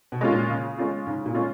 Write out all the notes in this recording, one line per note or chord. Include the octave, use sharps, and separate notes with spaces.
B2
G#3 C#4 F4
A#2
C#3
G#3 C#4 F4
G#2 C#3
A#2
G#3 C#4 F4